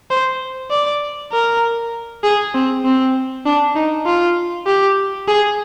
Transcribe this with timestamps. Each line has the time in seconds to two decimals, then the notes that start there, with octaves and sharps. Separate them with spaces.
0.10 C5
0.71 D5
1.32 A#4
2.23 G#4
2.54 C4
2.85 C4
3.46 D4
3.76 D#4
4.06 F4
4.66 G4
5.28 G#4